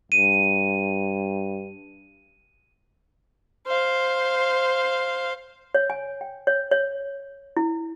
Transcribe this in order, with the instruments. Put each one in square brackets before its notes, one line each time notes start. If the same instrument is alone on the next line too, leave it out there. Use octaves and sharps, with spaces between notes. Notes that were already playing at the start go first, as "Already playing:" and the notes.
[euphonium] G2 [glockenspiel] D#7
[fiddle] C5 F5
[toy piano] C#5
G#5
G5
C#5
C#5
E4